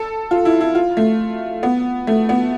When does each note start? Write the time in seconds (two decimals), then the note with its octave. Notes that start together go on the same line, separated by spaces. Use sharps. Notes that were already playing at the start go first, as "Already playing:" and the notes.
Already playing: A4
0.31 F4
0.45 E4
0.61 E4
0.75 F4
0.97 A3
1.63 B3
2.07 A3
2.29 B3